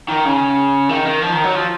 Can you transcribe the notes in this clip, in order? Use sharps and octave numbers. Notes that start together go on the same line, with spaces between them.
D#3
C#3
D#3
D#3
F3
D#3
F#3
F3